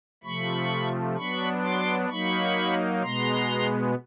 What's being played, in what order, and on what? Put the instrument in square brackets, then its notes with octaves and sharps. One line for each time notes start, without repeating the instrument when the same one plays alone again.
[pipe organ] C3 F3 A3 B5 C#6
F#3 B3 D4 B5 C#6
C6 D6
F#3 A#3 D#4 B5 C#6
B2 G#3 B3 A#5 C6